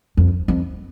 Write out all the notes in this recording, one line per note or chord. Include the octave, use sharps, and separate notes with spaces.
F2
F2